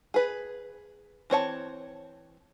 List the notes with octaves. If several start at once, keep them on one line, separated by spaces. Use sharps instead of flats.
G#4 B4
E3 C4 C#5 A5